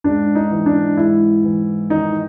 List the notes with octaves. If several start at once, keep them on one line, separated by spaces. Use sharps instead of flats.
G#2 D4
D#4
E3
D4
G#2 E4
E3
D#3 D#4